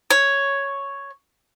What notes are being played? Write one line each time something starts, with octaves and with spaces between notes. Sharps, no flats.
C#5